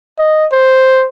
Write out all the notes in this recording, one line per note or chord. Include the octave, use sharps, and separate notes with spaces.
D#5
C5